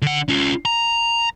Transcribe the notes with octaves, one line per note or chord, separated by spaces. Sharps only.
D3 F#5
C#4 F4
A#5